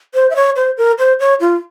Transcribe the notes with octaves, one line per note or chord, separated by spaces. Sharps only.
C5
E5
C#5
C5
A#4
C5
C#5
F4